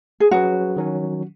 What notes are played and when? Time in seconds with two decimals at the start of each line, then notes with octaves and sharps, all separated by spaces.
0.20 G#4
0.31 F#3 C#4 F#4 G#4 B4
0.76 D#3 F#3 C#4